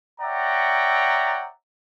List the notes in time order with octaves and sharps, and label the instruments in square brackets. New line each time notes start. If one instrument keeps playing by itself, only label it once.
[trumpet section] C#5 D5 E5 F#5 G5 A#5